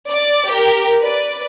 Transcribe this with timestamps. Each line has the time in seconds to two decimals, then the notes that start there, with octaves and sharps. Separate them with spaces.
0.11 D5 D6
0.49 G4 A#4
1.01 B4 D5